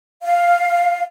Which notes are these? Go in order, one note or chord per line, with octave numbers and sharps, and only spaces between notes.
F5